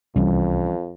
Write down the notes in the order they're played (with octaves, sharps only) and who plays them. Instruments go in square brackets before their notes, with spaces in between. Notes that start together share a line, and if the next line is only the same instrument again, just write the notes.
[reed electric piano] C2 [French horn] F2 [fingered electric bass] E3 G3 C#4